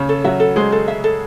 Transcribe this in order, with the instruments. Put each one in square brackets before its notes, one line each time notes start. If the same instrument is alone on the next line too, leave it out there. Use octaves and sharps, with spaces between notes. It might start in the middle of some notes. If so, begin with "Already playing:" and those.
Already playing: [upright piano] C#3 C#4
[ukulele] A4
[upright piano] F#3 F#4 [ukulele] E5
[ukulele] A4
[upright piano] G#3 G#4 [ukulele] C5
[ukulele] A4
E5
A4